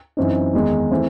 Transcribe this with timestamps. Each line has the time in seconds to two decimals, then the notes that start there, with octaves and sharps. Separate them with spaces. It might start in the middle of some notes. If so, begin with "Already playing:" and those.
0.17 F#2 E3 C4 D#4
0.54 E2 D#3 G#3 D#4
0.91 E3 A3 C4